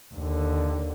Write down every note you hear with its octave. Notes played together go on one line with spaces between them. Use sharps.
D#2 D3